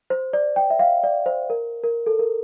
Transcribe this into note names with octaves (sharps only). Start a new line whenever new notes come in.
C5
D5
G5
E5
F5
D5
C5
A#4
A#4
A4
A#4